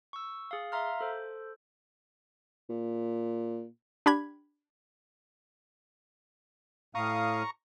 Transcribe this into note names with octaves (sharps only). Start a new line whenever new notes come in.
C#6 E6
G#4 F5
E5 F5 A#5 C6 F6
A4 C5
A#2
D4 G4 B5 G#6
A2 F5 A#5 C#6 D#6